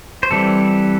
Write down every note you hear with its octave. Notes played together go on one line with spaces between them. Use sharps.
C5
E3 G3 C4 A4